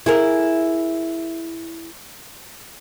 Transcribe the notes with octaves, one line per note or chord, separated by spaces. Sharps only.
E4 G#4 A#4